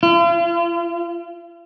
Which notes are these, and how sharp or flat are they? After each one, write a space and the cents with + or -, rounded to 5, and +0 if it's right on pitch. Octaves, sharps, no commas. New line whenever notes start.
F4 -40